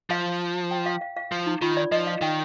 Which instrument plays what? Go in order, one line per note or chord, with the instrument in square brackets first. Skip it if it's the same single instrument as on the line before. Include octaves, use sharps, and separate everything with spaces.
[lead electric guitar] F3 [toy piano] F5
[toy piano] G5
F5
F5
F5
[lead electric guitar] F3
[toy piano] D#4
[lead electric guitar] D#3 [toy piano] F4
[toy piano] D5
[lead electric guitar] F3 [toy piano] D#5
[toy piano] F5
[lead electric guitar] D#3 [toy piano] G5